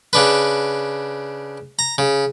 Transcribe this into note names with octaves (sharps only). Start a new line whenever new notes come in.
C#3 D4 B4
A#5
C#3